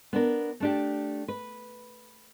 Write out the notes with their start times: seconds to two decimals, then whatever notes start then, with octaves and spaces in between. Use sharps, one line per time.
0.13 B3 D4 A#4
0.60 A3 D4 G4
1.28 B4